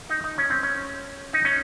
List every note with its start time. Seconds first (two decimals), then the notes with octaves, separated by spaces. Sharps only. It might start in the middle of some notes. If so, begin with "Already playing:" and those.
0.09 D#4
0.24 D#4
0.38 C#4
0.50 C4
0.63 C#4
1.33 D#4
1.45 C#4